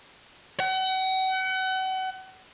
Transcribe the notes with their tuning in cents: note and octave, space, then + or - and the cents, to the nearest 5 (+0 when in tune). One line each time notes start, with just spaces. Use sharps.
F#5 +35